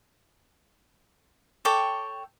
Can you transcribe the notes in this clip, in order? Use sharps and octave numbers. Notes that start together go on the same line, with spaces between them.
A4 C#5 G5 D6